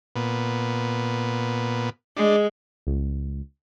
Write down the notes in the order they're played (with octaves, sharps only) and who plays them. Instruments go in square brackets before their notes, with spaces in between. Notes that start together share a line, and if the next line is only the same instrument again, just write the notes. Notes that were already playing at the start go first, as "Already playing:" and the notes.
[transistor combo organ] A#2 B3
[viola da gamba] G#3 [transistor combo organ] D4
[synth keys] C#2